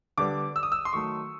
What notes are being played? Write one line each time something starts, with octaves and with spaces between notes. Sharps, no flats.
D3 G3 B3 D6
E6
D#6
E6
C6
D#3 F#3 A3 C#6